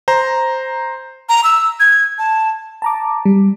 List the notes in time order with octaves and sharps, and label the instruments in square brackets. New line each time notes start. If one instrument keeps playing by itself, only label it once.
[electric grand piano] C5 A#5
[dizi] A#5
E6
G#6
A5
[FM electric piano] A5 A#5 D6
G3